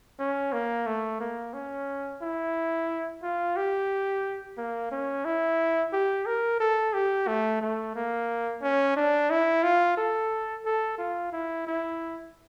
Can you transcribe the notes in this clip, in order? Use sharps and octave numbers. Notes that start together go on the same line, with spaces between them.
C#4
A#3
A3
A#3
C#4
E4
F4
G4
A#3
C#4
E4
G4
A#4
A4
G4
A3
A3
A#3
C#4
D4
E4
F4
A4
A4
F4
E4
E4